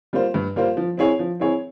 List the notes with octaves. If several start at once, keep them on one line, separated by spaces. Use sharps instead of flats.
G3 A#3 F4 C5
G2
G3 A#3 F4 C5
F3
C4 E4 G#4 C#5
F3
C4 E4 G#4 C#5